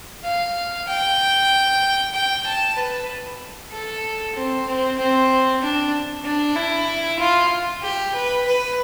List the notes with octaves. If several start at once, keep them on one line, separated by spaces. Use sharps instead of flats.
F5
G5
G5
A5
B4
A4
C4
C4
C4
D4
D4
E4
F4
G4
B4
B4